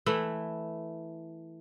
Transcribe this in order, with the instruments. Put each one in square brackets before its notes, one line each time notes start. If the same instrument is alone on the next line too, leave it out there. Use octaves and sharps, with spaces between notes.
[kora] E3 A3 E4